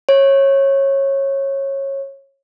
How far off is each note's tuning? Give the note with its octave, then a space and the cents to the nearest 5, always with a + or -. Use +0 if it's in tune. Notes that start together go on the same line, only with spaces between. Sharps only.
C#5 -20